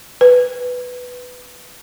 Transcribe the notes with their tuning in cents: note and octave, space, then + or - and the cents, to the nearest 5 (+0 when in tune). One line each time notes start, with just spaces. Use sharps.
B4 +5